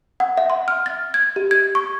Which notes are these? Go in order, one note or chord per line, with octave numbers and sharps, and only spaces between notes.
F#5
E5
C6
F6
A6
G#6
G4
G#6
C#6